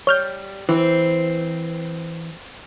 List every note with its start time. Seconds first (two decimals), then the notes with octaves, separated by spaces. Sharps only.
0.07 G3 C#5 F6 G6
0.69 E3 C4